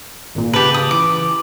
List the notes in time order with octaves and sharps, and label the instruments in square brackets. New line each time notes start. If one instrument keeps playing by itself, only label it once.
[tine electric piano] G#1 A#2
[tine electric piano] C#3 A5 [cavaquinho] G4 B4
[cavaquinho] D#6
[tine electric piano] E3 [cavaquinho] D6